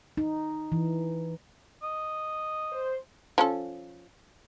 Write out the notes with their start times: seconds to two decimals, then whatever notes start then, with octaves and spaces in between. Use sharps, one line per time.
0.17 D#4
0.72 E3
1.83 D#5
2.72 C5
3.38 F3 C#4 A4